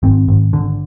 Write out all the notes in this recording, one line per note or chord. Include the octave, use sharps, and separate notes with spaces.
G#1 C4
G#1
D3